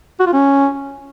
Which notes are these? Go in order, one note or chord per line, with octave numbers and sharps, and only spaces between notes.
F#4
F4
C#4